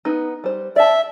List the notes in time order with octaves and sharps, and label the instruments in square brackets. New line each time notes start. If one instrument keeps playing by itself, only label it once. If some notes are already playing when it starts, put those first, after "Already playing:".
[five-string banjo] B3 D#4
G3 C5
[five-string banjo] D5 A5 [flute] E5